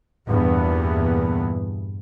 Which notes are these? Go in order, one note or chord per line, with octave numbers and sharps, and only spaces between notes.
E2 G2 A#2 E3 B3